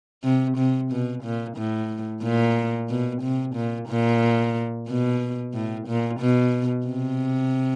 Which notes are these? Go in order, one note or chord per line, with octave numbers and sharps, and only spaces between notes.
C3
C3
B2
A#2
A2
A#2
B2
C3
A#2
A#2
B2
A2
A#2
B2
C3